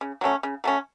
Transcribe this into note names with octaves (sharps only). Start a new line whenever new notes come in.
C#3
F#3 A3 C#4
C#3
F#3 A3 C#4